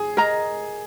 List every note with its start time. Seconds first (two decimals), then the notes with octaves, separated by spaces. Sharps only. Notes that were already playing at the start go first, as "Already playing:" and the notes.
Already playing: G#4
0.17 A#4 D#5 A#5